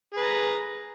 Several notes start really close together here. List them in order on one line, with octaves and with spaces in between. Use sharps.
G#4 B4 A#5